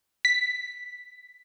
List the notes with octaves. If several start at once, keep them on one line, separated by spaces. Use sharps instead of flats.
B6